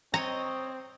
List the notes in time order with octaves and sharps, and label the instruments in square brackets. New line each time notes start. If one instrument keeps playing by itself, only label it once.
[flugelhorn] C4 [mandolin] C#5 D#5 [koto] A#5